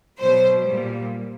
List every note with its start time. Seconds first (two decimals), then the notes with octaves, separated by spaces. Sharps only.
0.18 B2 F#3 C5
0.64 G3
0.69 A#2